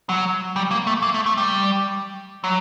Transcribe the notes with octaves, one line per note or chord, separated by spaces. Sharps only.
F#3
G3
A#3
A3
A#3
A3
A3
G3
F#3